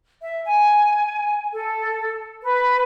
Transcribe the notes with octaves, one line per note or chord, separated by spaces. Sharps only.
E5
G#5
A4
B4